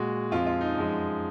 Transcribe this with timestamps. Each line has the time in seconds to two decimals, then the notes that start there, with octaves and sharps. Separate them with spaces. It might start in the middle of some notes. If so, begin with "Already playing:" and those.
Already playing: A#2 G#3 F#4
0.31 F2 F3 G#3 F4
0.46 F4
0.61 D#4
0.75 F#2 F3 G#3